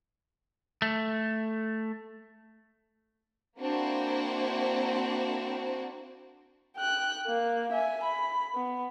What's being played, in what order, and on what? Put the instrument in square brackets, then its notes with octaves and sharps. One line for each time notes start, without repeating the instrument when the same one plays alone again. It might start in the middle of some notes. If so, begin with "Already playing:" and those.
[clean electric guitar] A3
[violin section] A#3 C4 D4 E4 F#4 C5
[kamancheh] G5 F#6
A#3
E5 G#5
B5
B3